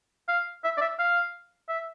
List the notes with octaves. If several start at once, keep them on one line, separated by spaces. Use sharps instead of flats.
F5
E5
D5
E5
F5
E5